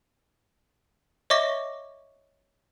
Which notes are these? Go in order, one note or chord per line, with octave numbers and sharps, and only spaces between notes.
C#5 D#5 E5 C#6 D6 A#6